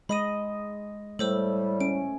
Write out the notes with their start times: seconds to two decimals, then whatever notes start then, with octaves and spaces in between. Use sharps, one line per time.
0.09 G#3 D#5 B5 D#6 D#7
1.19 A2 G3 A3 A4 C5 E6
1.81 C#4 D7